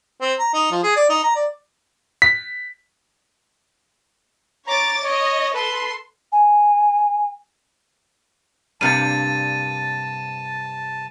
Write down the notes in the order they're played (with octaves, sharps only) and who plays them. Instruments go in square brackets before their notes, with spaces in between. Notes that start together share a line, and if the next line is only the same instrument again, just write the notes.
[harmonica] C4
A#5
D#4
F3
G#4
D5
D#4
A#5
D5
[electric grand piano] B6
[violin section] C#5 D6 A6 [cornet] A#5
[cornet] C#5 [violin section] D#5
[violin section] A4 C6 [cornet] B4
[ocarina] G#5
[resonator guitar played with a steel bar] G2 C3 A#3 [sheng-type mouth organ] A5 [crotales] A6 D#7